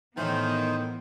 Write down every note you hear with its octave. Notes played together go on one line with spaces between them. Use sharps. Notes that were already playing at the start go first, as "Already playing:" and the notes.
A2 D#3 E3 B3 C5